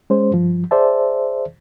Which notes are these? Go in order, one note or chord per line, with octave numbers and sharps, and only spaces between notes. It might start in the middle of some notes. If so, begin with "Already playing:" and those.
G#3 C#4 C5
G2 F3
G#4 C5 D5 E5 A5